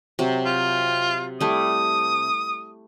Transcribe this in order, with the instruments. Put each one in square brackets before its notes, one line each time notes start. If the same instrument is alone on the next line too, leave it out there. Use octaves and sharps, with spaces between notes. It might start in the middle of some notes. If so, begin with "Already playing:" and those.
[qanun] C3 F#3
[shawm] F4
[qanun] G3 A3 E4 [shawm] D#6